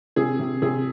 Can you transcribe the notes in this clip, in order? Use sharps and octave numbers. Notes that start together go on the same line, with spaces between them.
C3 G#4
C3
C3 G#4